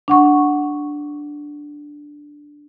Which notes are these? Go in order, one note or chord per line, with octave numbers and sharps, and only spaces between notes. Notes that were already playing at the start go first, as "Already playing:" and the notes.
D4 F#5 C#6